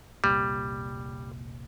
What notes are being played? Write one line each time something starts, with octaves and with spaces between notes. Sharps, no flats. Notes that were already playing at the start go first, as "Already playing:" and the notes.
F1 C2 A#2 G3